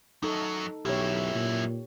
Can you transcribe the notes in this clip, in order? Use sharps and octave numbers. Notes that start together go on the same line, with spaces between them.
F#2 F#3 D#4 A4
B1 F#2 E4 G4 C#5
A#2